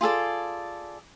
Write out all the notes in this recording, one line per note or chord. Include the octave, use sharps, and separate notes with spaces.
F4 G#4 A4 D5